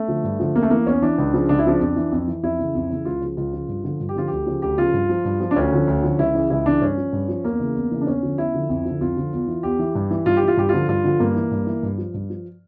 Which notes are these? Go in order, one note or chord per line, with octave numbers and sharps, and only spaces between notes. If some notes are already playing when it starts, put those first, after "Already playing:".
Already playing: A3
D3 F3
G2
D3 F3
E2 A#3
A3
E3 A#3
E2 C#4
E3 D4
C#2
C#3 F3
C#2 D4
E4
C#3 F3 D4
F2
E3
F2
E3
F2 E4
C#3 E3
F2
C#3 E3
C#2 F4
C#3 F3
C#2 F4
C#3 F3
G2
D3 F3
G2
G4
D3 F3 F4
D2 G4
C#3 F3
D2 G4
C#3 F3 F4
G2
F3
G2
F3
D4
D2 C#4
D3 F3
D2
D3 F3
C#2 E4
C#3 E3
C#2 E4
C#3 E3 D4
G2 C#4
F3
G2
F3
E2 A#3
C#3 E3
E2
C#3 E3
D4
E2 C#4
D3 F3
E2 E4
D3 F3
F2
D3 F3
F2 F4
D3 F3
E2
E3
E2 G4
E3
G2
E3
G2 F4
G4
E3
F4
G2 G4
D3 F3 F4
G2 F4
D3 F3
G2 A#3
E3
G2
E3
G2
F3
G2
F3